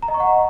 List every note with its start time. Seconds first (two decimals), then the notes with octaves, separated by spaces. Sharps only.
0.02 A#5
0.08 D#5
0.14 C#6
0.20 F#5